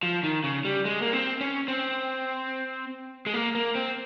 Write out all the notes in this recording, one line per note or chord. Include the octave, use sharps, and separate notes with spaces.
F3
D#3
C#3
G3
G#3
A#3
C4
C#4
C4
G#3
A#3
A#3
C4